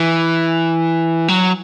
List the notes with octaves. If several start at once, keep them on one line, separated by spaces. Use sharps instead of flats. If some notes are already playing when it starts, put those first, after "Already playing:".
Already playing: E3
F#3